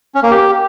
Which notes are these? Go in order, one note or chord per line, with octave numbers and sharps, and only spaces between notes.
C#4
A#3
G4